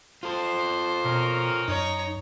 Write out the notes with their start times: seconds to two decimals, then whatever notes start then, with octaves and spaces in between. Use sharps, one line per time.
0.23 F4 A4 C5
1.04 B2 C4 C#4 A#4
1.68 F#2 D#4 C#5 A#5